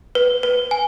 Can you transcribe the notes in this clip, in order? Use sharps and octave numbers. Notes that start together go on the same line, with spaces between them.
B4
B4
G#5